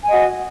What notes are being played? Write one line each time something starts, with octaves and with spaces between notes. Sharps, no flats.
F#4 D#5 G#5